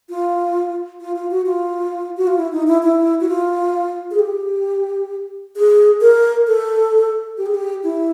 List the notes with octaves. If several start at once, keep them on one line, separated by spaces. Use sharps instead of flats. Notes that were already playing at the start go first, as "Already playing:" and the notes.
F4
F4
F4
F#4
F4
F#4
F4
E4
D#4
E4
E4
F#4
F4
G#4
G4
G#4
A#4
A4
G4
G#4
G4
E4